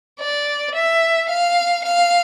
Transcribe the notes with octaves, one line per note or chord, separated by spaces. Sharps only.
D5
E5
F5
F5